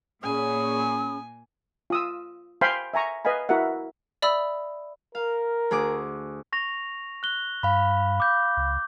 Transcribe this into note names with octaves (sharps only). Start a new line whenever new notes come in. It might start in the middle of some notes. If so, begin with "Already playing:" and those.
A#2 C#4 G#4 G#5 B5 D#6
F4 D#6 E6
C5 F5 G5 G#5 B5 C6
E5 G#5 A#5 C#6
B4 D#5 F5 G#5 B5
E4 F#4 A#4 E5 F#5
D5 E5 B5 D#6 E6
A#4 F5
D2 G#4 D6
C#6 A#6 F7
F#6 G7
G2 F5 B5
D6 G6
C#2